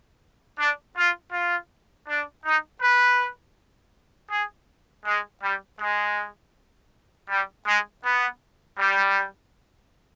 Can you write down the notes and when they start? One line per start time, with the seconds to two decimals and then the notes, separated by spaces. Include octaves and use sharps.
0.58 D4
0.96 F4
1.33 F4
2.08 D4
2.45 D#4
2.81 B4
4.30 G#4
5.05 G#3
5.42 G3
5.79 G#3
7.29 G3
7.66 G#3
8.03 B3
8.77 G3